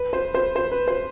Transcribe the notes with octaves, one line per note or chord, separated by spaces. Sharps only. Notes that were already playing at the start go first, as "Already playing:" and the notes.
Already playing: B4
C5
C5
C5
B4
C5